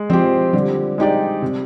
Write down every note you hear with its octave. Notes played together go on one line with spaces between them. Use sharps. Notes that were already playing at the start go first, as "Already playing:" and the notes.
Already playing: G#3
F3 C4 G4
D3 G3
G#3 D#4 G4 D5
C3